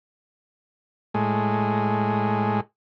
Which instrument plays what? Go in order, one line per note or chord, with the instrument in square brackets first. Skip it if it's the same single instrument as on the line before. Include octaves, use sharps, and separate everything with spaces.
[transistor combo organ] A2 G#3